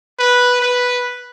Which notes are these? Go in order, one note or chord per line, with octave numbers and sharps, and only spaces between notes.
B4
B4